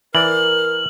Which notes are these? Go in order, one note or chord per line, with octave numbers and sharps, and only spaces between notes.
E3 A#4 D5 F6 F#7